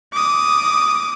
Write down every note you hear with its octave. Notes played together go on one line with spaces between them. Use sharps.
D6 D#6